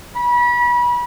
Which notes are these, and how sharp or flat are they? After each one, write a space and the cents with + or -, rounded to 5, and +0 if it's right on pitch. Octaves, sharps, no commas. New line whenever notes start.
B5 -30